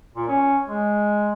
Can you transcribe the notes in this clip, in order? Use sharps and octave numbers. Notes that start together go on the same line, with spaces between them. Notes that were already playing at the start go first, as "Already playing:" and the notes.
A#2
C#4
G#3